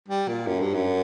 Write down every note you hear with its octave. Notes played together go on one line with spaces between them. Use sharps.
G3
A#2
F#2
G2
F#2